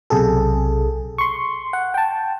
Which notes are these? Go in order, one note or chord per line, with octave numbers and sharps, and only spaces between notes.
B1 C3 G#4 A4
C6 C#6
F#5
G5 A5